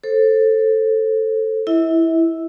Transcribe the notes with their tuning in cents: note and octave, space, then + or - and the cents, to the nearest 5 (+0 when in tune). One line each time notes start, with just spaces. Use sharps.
A4 +5 C5 +25
E4 +0 E5 -40